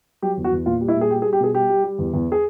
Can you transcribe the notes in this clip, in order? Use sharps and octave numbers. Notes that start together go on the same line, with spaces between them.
F#3 G4
E2
F#4
E2
A#2 F4
G3
E4
A#2
G#4
G3 G4
G#4
G3
G4
B2 G#4
G3 G4
G3
G3
E2
E2
G#4